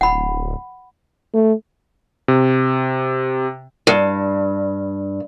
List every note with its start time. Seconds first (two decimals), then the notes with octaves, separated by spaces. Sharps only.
0.01 D1 F#5 B5
1.34 A3
2.28 C3
3.87 G2